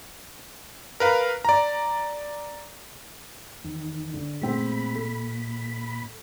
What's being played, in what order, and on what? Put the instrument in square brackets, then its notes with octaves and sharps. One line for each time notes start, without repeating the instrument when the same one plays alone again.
[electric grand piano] A#4 B4 F5
D5 A#5
[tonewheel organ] E2 D#3
[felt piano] D3
[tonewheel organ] A#2 B5 [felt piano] G#3 A3 C4
[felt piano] A4